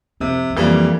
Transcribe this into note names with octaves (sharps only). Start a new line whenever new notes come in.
F2 C3
E2
F2 E3 G3 A#3